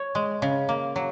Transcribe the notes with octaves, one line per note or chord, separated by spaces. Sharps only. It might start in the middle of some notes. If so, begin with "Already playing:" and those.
Already playing: C#5
G#3
C#3
A#3
F#3